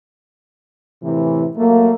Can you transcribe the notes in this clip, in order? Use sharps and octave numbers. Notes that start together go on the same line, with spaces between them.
A2 C3 E3
F#3 A3 A#3